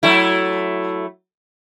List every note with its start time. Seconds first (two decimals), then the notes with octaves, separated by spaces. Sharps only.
0.03 F#3 A3 E4